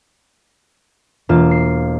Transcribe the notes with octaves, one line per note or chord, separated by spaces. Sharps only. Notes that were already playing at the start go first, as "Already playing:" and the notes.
E1 A#3 F4 E7
C7